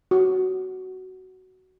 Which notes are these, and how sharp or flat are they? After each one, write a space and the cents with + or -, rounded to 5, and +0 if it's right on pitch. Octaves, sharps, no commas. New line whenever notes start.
F#4 +10